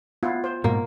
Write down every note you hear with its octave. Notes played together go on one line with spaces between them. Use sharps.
B3 E4 F4
C5
G#2 B2 A#3